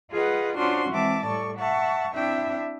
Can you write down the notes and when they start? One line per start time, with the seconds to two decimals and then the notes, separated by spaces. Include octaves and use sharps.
0.12 F4 G#4 B4 D#5 F#5
0.58 C#4 D4 F4 F#4 C5 C6
0.90 E3 G#3 C4 E5 A5 D6
1.26 A2 G3 A4 D5 C#6
1.57 E5 F#5 A5 C#6
2.15 C4 D4 E4 E5 G5